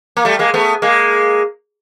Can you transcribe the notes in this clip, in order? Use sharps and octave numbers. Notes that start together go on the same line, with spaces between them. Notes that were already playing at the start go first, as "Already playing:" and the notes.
A#3
G3 A3
G#3 A#3
A3 B3
G#3 A#3